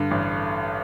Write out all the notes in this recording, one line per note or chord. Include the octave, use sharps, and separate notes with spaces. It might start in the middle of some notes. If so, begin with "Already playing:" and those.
Already playing: G2 D3
A1